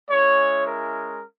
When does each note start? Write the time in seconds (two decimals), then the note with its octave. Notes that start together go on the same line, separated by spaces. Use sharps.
0.10 G#3 C#4 E4 C#5
0.67 A#4